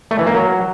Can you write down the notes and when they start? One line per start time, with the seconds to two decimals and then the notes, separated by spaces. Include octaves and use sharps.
0.11 A3
0.19 E3
0.27 A#3
0.34 F#3